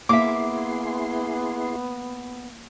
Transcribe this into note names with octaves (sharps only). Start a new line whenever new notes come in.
A#3 B3 E4 G#4 E5 C6 D6